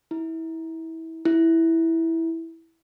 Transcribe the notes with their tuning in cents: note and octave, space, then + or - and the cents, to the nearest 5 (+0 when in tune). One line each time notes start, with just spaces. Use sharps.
E4 -25
E4 -5